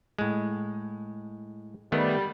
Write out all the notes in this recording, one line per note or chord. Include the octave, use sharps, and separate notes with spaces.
A2 G#3
D#3 G3 A3 B3